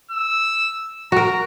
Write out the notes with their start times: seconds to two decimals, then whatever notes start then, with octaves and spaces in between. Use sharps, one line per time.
0.11 E6
1.12 F#4 A#4 A#5